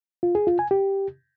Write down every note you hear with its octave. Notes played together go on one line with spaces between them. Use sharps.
F4
G#4
F4
G#5
G4